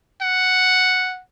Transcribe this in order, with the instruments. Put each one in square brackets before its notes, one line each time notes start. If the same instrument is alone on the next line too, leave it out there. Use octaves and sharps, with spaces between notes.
[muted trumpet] F#5